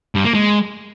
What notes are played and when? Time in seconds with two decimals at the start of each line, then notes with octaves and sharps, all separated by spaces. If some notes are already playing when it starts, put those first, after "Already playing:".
0.15 G2
0.25 A#3
0.34 G#3